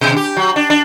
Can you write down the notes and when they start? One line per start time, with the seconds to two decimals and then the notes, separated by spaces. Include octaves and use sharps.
0.01 B2
0.16 G4
0.37 F#3
0.56 D4
0.70 D4